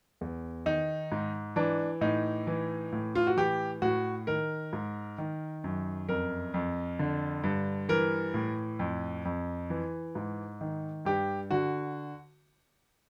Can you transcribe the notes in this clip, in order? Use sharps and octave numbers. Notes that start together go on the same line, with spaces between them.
E2
D#3 D#4
G#2
E3 D4
A2 D#4
E3
A2
F4
F#4
E3 G4
A2 F#4
D#3 A#4
G#2
D#3
F#2
F2 A#4
F2
D3
G2
E3 A#4
A2
F2
F2
E3
G#2
D#3
G2 G4
D3 F#4